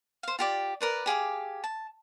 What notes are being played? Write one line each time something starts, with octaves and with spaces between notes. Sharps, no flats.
C5 F5
F4 G4 D5
A#4 B4 D5
G4 G#4 F5 D6
A5